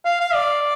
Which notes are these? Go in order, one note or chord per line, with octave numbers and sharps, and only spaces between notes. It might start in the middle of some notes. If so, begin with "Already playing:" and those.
F5
F5
D5